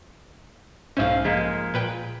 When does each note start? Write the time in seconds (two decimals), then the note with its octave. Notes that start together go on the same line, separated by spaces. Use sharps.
0.97 B1 G#2 C#4 C5 E5 F5
1.24 F3 G#3 A#3
1.74 A#2 B4 G5